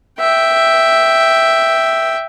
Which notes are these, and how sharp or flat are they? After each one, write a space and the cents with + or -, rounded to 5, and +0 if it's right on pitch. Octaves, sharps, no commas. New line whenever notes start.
E5 +0 G5 +0